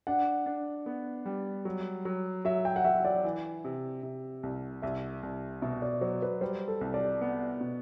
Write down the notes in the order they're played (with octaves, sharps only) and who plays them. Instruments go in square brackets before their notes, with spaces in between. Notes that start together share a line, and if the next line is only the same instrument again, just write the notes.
[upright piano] D4 [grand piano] F#5
[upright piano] D4
B3
G3
F#3
F#3
[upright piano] F#3 [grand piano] E5
[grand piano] G5
F#5
[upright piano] F#3 [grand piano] E5
[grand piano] D5
[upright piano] E3
C3
C3
C2
[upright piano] C2 [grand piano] E5
[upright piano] C2
[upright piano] B2 [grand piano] E5
[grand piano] D5
[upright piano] F#3 [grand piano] C5
[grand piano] B4
[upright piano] G3 [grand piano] C5
[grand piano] A4
[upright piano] C2
[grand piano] D5
[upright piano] B3
B2